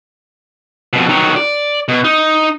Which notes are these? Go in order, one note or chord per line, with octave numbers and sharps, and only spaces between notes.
F2 B2
D#3 F#3
D5
B2
D#4